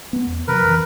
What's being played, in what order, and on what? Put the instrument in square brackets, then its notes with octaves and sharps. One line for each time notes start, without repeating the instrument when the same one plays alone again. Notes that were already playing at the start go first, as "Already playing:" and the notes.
[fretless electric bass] B3
E2
[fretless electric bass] C3 F3 F#3 [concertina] A#4 B4
[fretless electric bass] F2 E3